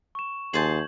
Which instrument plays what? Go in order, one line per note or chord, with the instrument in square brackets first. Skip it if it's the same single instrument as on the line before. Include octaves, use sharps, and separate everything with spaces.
[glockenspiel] C#6 E7
[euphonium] D#2 [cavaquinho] G#4 C5 A5 [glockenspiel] G6 G#6 F#7